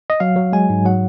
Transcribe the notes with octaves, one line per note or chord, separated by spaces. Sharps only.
D#5
F#3 F5
F#3
G#3 G#5
G#2
F#3 F#5